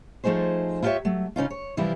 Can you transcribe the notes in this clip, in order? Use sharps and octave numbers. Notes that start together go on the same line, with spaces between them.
F3 A3 D#4 G#4 C5
E4 F4 G4 A4 C#5 E5
F#3 A3
C#3 C#4 D#4 F4
C#5
C3 E3 F3 G3 E4 F4